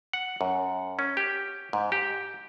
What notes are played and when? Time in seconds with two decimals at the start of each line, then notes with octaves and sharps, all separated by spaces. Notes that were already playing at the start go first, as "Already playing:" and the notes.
0.13 F#5
0.41 F#2
0.99 C#4
1.17 G4
1.73 G#2
1.92 G4